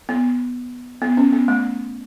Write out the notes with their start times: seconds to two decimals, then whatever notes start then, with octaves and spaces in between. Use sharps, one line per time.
0.09 B3
1.02 B3
1.17 C#4
1.32 B3
1.48 A3